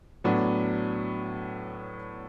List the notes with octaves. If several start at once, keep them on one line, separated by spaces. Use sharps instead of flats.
A2 F#3 B3 D4